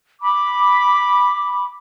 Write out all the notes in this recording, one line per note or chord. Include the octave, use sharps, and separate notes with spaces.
B5 D6